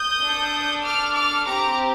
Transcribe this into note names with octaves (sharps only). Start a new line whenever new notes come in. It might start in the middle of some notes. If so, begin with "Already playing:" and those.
Already playing: D#6 G6
D4 A4
D6 F6
D6 F6
C4 G4 A#5 D6